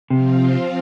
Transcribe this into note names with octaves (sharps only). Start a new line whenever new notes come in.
C3 F3 C4 F4